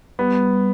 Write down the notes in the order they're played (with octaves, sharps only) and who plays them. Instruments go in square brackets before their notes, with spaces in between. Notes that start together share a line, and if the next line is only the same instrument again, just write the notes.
[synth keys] G3 [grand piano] B3